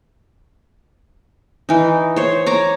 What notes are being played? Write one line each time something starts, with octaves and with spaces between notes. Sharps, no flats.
E3 D#4
C5 C#5
C#5 A#5 D6